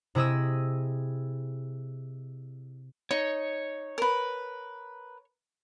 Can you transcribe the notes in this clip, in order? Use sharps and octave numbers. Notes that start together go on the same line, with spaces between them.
C3 E4 G#4 D#5 E6
D#4 C#5
A#4 B4